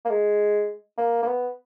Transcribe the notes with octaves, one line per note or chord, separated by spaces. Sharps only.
A#3
G#3
A#3
A#3
B3